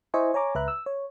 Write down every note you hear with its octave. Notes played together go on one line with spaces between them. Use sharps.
E4 C5 D#5 E5 G#5 C#6
C#5 G#5 A#5 D6
C#2 B4 E5 A#5 F#6
E6
C#5